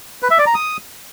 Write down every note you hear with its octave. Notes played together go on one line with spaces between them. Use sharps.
B4
E5
D5
A#5
D#6